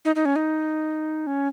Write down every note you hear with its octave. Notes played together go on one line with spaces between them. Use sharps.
D#4
D#4
C#4
D#4
C#4